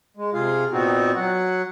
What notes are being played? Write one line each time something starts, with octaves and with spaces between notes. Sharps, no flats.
G#3
C3 F4 G#4 F5
A#2 B3 C4 D#4 F#4
F#3 F#5